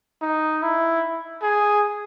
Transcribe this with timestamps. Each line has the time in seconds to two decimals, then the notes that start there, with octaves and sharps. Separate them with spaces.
0.21 D#4
0.62 E4
1.42 G#4